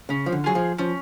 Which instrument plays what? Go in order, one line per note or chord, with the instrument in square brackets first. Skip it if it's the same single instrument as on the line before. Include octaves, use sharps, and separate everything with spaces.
[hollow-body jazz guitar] C#3 [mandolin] C#4
[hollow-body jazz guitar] F3
D3
[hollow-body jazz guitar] F#3 [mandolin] F4 G#4
[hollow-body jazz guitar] F3
[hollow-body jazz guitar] F3 [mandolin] C#4